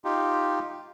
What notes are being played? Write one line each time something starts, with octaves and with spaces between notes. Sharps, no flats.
D#4 F4 G4